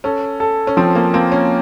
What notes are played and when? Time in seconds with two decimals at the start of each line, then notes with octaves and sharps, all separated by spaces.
0.04 C#4 A4
0.40 A4
0.67 C#4
0.77 F3 C4
0.95 A#3
1.14 A#3 C4
1.32 C#4